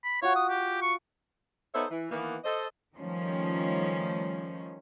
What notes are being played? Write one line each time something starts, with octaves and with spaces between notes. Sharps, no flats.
B5
F4 F#4 C#5
D#6
G4
C#6
B3 D#4 A4 C5 C#5 E5
E3
D#3 E3 A#3 B3
A4 C5 D#5
D#3 F3 G3 A3 C#4